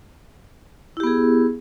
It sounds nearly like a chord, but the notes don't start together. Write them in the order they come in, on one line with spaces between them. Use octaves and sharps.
E4 G4 B3 G#4